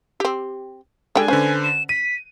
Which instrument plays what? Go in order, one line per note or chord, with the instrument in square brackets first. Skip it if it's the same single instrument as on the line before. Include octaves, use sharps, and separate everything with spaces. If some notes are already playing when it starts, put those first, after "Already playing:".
[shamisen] C4 G4
[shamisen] D3 G3 G5 [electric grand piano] G#3 D4 [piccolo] G#5
[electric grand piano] D3 B4 C5 [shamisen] C#4
[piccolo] E7
[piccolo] B6 [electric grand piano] D#7